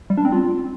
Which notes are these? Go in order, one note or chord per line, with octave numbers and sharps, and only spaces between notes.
G3
D4
C4
F4